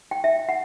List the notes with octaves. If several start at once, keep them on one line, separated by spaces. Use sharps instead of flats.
G5
E5
F#5